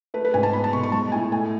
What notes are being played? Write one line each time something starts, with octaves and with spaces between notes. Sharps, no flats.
A3 B4
B4
G#2 G#5
A5
B3 B5
A5
B2 C#6
C#6
G#3 A5
A2 G#5
A3 G#5